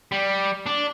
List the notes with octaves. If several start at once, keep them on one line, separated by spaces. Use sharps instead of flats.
G3
D4